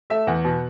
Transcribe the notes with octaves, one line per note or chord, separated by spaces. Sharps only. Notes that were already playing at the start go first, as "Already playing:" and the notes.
A3 E5
E2 F#5
B2